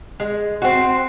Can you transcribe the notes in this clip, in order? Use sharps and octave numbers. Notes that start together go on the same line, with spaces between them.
G#3
C4 F#4